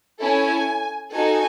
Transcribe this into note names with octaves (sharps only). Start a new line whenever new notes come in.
C#4 E4 A4 G#5
D#4 F#4 A4 G#5